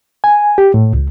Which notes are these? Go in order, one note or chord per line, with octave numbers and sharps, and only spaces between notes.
G#5
G4
A2
C#2